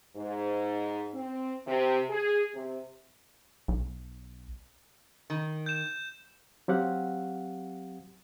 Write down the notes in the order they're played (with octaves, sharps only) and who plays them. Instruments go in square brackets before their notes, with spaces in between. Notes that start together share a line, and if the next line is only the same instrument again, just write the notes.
[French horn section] G#2
C4
C3
G#4
C3
[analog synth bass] B1
[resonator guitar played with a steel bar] D#3
[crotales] G6 E7
[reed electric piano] F#3 C4 G4 F5 F#5